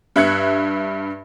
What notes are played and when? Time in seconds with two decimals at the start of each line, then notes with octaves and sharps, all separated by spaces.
0.16 G2 E5 F#6 G#6 C#7